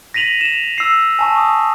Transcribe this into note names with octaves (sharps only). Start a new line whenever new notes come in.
A#6 B6 D#7 F7 F#7
E7 F7
E6 C7
G#5 A5 C#6
C#6 D#6